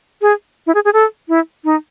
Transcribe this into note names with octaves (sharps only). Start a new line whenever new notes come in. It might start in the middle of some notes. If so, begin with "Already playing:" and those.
G#4
E4
G#4
G#4
A4
E4
D#4